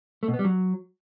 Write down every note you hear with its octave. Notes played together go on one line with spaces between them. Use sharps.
A3
B2
B3
G3
F#3